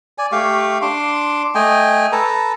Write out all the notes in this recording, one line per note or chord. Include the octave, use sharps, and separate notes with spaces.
D5 G#5
A3 G4 F5 C#6
D4 C6 D6
A3 D#5 G5 G#5
A4 B4 A5 A#5